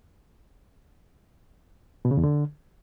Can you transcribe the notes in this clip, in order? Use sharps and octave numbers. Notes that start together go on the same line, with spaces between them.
B2
C#3
E2
D3